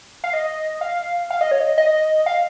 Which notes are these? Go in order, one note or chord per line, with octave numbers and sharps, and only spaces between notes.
F5
D#5
F5
F5
D#5
C#5
D#5
D#5
F5